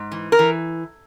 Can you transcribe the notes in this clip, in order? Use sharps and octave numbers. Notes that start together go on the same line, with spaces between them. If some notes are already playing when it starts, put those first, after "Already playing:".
Already playing: G#2
E3
A#4
E3